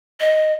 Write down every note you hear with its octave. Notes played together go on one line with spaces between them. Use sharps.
D#5